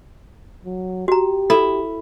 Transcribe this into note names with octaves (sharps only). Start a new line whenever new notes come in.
F#3
F#4 G4 A#5
E4 A4